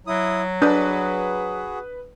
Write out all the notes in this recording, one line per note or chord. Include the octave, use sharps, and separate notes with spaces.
F#3 E4 D#6
D4 F#4 G#4 B4 D#6